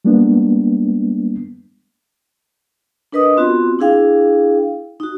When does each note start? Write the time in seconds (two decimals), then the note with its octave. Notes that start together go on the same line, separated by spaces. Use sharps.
0.05 G3 G#3 A#3 B3 D4
3.12 D4 A#4 B4 D#5 D#6
3.37 B3 C4 F4 F#4
3.79 D4 E4 G#4 F5 G5
5.00 D#4 F#4